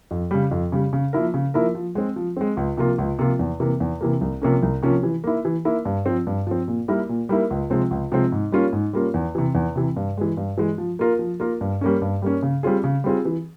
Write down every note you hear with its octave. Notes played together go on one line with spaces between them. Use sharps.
F2
C#3 G3
F2
C#3 G3
C#3
F3 A#3 E4 A#4
C#3
F3 A#3 E4 A#4
F3
G#3 C4
F3
G#3 C4
C#2
C3 F3 A#3 F4
C#2
C3 F3 A#3 F4
E2
C3 E3 A#3
E2
C3 E3 A#3
C2
C3 F3 A#3 C#4
C2
C3 F3 A#3 C#4
E3
A#3 E4
E3
A#3 E4
G2
F3 C4
G2
F3 C4
A#2
G3 A#3 E4 A#4
A#2
G3 A#3 E4 A#4
C#2
C3 F3 G#3 C4
C#2
C3 F3 G#3 C4
G#2
G3 A#3 C#4 F4
G#2
G3 A#3 C#4 F4
E2
C3 E3
E2
C3 E3
G2
E3 G#3
G2
E3 G#3
F3
A#3 F4 A#4
F3
A#3 F4 A#4
G2
G3 A#3 C#4
G2
G3 A#3 C#4
C#3
G3 C4 F4 G#4
C#3
G3 C4 F4 G#4
E3